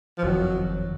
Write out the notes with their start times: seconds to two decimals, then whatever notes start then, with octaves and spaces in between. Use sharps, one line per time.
0.18 F3
0.23 F#1 F2 D#3 F#3